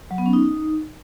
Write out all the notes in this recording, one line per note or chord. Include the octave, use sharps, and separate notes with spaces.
F#3
B3
C#4
D#4